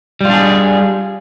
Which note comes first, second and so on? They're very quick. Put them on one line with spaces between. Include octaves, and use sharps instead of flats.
G3 F4 D4 G#4